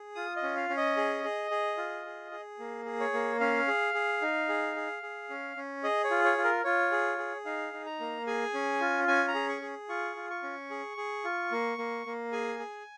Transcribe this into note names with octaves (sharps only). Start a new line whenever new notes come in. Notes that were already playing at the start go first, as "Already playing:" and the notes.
Already playing: G#4
F4 D#6
D#5
C#4
F5
C#4
D#5
G#4
G#4
G#4
F4
G#4
G#4
A#3
G#4
C#5
A#3
C#4 F5
G#4
G#4
D#4
G#4
G#4
G#4
C#4
C#4
G#4 D#5
C#5
F4
C#5
F4
A#4
F4 C#5
G#4
G#4
D#4 F5
D#4
A#5
A#3
G#4 G#5
C#4
F4
C#4 G#5
A#5
G#4
C#6
G#4
F4 C#6
F4
C#6
C#4
G#4
G#4
F4
A#3
A#3
A#3
G#4 G#5
G#4